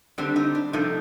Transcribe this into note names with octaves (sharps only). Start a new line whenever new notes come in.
D3 G3 C4 D4
D#4
D4
C3 F3 A3 D4 D#4